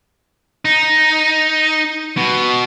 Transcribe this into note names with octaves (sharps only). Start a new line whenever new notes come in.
D#4
B2